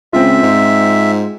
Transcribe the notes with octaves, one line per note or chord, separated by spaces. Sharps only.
C#2 C4 F4 E5
G#2